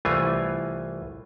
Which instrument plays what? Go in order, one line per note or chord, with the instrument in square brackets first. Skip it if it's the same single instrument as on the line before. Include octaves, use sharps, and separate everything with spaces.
[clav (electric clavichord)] C2 E3 A3 F4 G#5